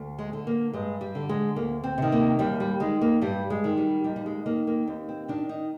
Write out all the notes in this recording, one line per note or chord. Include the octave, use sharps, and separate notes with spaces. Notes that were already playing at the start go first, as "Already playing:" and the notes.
Already playing: D2
G#3
D3
A#3
G2 G#3
G3
D3
G#3
D2 A#3
C4
C3 D#3
A#3
D#2 G3
G3
D#3 G#3
A#3
G2 G3
G#3
D#3
G3
D#2 G3
G3
G#3
D#3 A#3
A#3
D#2 C4
C4
D#3 D4
D#4